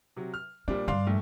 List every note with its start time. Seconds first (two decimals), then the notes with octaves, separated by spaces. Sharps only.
0.17 C3 F#3
0.34 F6
0.68 A#2 G3 C4 D4
0.88 G2 G3 D4 F5 C6
1.07 A#1 A3